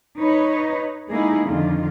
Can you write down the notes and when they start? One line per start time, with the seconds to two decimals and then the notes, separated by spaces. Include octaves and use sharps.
0.18 D#4 B4 C#5
1.09 G#3 A#3 D#4 E4 G#4
1.46 F2 D3 D#3 F4